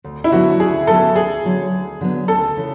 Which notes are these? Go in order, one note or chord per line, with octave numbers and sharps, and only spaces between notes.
D2
E4
D3 F#3 B3 F#4
D2 G#4
D3 F#3 B3 A4
D2 G#4
D3 F#3 B3
D2
D3 F#3 B3
D2 A4
C#3 E3